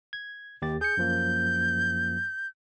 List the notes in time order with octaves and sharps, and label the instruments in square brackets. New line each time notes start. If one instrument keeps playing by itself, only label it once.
[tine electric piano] G#6
D#2 G4 A6
[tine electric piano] G#4 C#7 [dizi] G6
[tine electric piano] F#2 F3 A#3